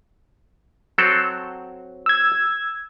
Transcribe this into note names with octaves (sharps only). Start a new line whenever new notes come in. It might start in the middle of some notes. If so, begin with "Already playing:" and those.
F#3 C4 A4
E6 G#6